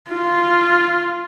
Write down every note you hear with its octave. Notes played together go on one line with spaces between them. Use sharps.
F4